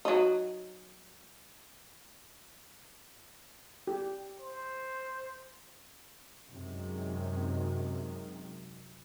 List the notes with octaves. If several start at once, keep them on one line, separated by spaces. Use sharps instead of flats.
F#3 D#4
G4
C5
F#2 C3 D#3 G#3